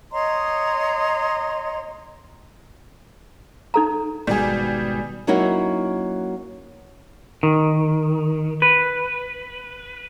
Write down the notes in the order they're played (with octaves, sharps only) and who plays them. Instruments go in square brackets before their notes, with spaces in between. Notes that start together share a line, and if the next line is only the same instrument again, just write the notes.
[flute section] C#5 D#5 A#5 C6
[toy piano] D#4 A4 A#5
[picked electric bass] G#1 G#2 B2 [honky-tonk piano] G3 G#4
[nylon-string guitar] F#3 A#3 C#4 D#4 E4 F#4
[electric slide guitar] D#3
B4